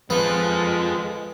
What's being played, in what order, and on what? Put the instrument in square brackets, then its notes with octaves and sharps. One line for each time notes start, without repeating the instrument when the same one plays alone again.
[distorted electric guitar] F3 A4 [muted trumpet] G#3 [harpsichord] B3